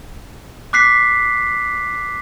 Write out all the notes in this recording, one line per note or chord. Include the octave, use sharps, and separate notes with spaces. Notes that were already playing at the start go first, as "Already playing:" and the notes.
D6 F#6 B6 C7